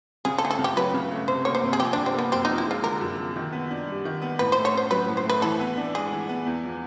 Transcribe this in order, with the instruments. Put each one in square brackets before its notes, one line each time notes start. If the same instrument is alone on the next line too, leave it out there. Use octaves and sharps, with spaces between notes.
[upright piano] C#3 [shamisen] G#4
[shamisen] A4
[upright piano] A3 [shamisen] G#4
[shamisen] A4
[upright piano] C#3
[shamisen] G4
[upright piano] F#3 [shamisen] B4
[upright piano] C#3
A3
[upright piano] C3 [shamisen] C5
[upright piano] A#3 [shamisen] C#5
[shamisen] C5
[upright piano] C3
[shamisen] G#4
[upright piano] F3 [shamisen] G4
[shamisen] D4
[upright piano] C3
[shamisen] C4
[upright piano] A#3 [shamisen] B3
[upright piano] F#2 [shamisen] C4
[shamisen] D#4
[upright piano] F3
[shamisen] E4
[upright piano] G#3 [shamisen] F4
[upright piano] D3 [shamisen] A#4
[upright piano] F#2
F3
D#3
B3
D4
G3
D#3
B3
[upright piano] A2 [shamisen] B4
[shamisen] C5
[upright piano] A3
[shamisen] C#5
[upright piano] C#4 [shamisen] C5
[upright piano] F#3 [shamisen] B4
[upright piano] A2
[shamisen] C5
[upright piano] A3 [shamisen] B4
[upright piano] E3 [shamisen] A4
[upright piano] B3
D4
[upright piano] G#3 [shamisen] G#4
[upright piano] E3
B3
E2
F3